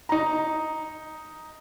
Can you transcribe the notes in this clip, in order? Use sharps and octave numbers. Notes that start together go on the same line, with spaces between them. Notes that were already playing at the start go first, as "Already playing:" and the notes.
D#4 A#5